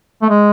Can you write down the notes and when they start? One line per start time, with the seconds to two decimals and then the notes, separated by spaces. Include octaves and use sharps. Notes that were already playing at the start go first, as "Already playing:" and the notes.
0.22 A3
0.30 G#3